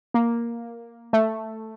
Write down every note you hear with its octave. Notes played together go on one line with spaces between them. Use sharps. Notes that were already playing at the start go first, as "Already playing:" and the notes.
A#3
A3